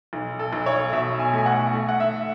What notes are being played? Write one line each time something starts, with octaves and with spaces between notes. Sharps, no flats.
B1
A4
B1
C#5
B2 E5
G#5
A3 G#5
F#5
A3
F#5
E5